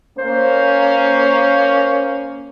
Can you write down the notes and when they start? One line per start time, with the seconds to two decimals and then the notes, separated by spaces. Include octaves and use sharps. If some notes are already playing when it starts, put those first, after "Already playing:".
0.18 A#3 C#4 C5